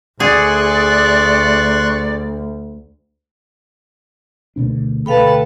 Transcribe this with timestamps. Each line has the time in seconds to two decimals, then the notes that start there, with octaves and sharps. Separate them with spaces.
0.20 D2 G#4 D5 C6 C#6 F#6
4.56 D2 B2 D4
5.06 D2 B2 A4 B4 F5 G5 A5 B5